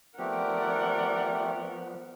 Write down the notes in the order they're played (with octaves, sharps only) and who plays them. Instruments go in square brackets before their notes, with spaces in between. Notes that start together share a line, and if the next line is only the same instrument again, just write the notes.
[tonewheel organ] F3 B3 [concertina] A3 C4 G4 [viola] A#4 [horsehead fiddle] D5 F#5